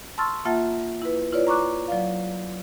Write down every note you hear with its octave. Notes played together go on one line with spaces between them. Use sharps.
A5 C6 C#6 E6 F6 A6
A#3 F4 E5 F#5 A5 A6
E4 B4
E4 F4 B4 C#5 D5
A#5 C#6 D6 F#6
F#3 D5 F5